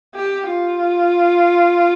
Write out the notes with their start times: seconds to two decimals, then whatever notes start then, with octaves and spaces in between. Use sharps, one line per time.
0.15 G4
0.48 F4